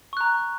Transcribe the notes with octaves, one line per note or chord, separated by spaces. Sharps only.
A#5 C#6 F#6